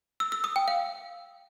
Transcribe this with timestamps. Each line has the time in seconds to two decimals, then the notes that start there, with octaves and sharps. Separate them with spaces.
0.20 E6
0.32 E6
0.44 D#6
0.56 G5
0.68 F5